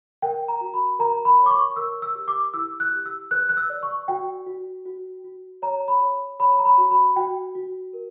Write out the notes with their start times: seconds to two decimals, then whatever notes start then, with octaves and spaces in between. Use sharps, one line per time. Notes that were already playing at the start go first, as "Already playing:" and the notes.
0.22 A#4 G5
0.48 A#5
0.61 F#4
0.74 B5
0.99 A#4 A#5
1.25 B5
1.39 C#5
1.46 D6
1.51 C#6
1.76 A#4 E6
2.02 E6
2.15 G4
2.28 D6
2.54 E4 E6
2.80 F#6
2.93 G4
3.05 E6
3.31 B4 F#6
3.49 F#6
3.57 E6
3.70 D5
3.83 C#6
4.08 F#4 G5
4.46 F#4
4.85 F#4
5.24 F#4
5.62 C#5 A#5
5.88 B5
6.00 C#5
6.40 C#5 B5
6.59 A#5
6.65 B5
6.78 F#4
6.91 B5
7.16 F#4 G5
7.55 F#4
7.93 A#4